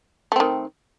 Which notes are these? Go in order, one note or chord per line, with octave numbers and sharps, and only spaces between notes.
D#3 A3 C4